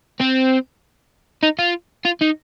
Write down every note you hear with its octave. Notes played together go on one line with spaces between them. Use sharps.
C4
D#4
F4
F4
D#4